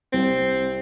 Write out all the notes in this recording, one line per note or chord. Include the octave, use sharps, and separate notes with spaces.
C2 C4